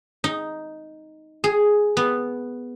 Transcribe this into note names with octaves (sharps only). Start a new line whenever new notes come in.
D#4
G#4
B3